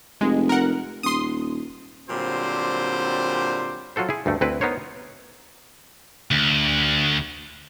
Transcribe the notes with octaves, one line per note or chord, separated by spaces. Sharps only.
F1 G#3
A#4 F#5
D#1 C6 D#6
A#2 D3 F#3 G3 C4 C5
F#3 F4 F#4 A4 C5
E4 G#4
D2 G2 A3
D2 C4 E4 B4
B3 D#4 A#4 C5 C#5
D2